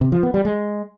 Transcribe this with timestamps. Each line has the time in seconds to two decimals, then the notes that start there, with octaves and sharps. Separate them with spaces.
0.01 C3
0.12 F3
0.23 B3
0.34 G3
0.45 G#3